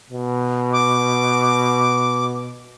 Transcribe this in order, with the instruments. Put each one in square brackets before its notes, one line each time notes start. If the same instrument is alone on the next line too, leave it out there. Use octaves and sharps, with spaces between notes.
[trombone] B2
[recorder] D6